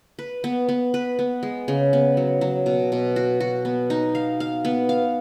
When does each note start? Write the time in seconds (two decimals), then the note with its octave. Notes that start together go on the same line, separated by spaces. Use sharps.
0.19 B4
0.44 B3
0.69 B3
0.94 B4
1.19 B3
1.43 G#3
1.68 C#3
1.93 B3
2.17 F#3
2.41 F#3
2.66 B2
2.92 B2
3.16 F#4
3.40 F#4
3.65 B3
3.90 D#4
4.15 F5
4.40 F5
4.65 B3
4.89 F5